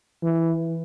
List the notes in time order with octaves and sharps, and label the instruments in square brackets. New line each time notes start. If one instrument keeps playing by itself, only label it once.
[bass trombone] E3